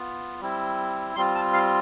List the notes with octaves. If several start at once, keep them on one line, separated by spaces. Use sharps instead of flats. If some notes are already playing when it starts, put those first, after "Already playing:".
Already playing: B3 F4
G3 C4 E4
G3 C4 F4 C6
A5
F5